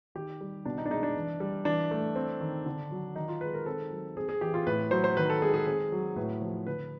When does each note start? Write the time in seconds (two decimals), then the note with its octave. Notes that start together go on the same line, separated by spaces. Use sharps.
0.15 D#3 G4
0.41 G3
0.65 B2 D4
0.78 D#4
0.86 D4
0.90 G#3 D#4
1.03 D4
1.16 E3
1.40 G3
1.65 E3 D4
1.91 A3
2.15 C4
2.40 D#3
2.66 D3
2.91 F#3
3.16 D#3 D#4
3.28 F4
3.41 G#3 B4
3.54 A#4
3.66 C4 A4
3.91 F#3
4.17 C4 G#4
4.29 G#4
4.41 E3 G4
4.54 F4
4.67 A2 B4
4.91 F#3 C5
5.04 C5
5.17 D#3 B4
5.30 A4
5.41 G#3 G#4
5.54 G#4
5.66 C4 G#4
5.92 F#3
6.16 A2 B4
6.42 F3
6.67 D3 B4